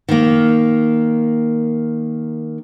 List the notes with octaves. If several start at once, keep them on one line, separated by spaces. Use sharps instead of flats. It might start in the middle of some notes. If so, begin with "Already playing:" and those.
D#3 A#3